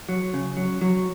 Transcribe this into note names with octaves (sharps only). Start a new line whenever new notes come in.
F#3
C#3
F#3
F#3